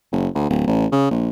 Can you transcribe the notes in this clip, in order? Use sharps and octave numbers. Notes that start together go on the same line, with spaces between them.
F#1
D2
D1
A1
C#3
A#1